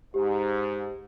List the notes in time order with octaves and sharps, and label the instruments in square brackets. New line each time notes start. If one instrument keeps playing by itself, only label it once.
[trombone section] G#2 [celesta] G4